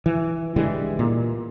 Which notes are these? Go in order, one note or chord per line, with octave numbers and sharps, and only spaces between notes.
E3
D3 E3 G3 G#3
A#2